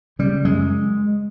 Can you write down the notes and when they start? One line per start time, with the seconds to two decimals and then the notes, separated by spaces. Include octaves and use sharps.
0.19 C#3 G3
0.45 F#2 G#3